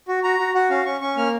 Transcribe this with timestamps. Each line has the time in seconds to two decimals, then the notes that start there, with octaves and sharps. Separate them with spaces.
0.08 F#4
0.23 F#4 A#5
0.39 F#4
0.55 F#4 F#5
0.70 C#4 F5
0.86 C#4 C#6
1.01 C#4 C#6
1.16 A#3 F6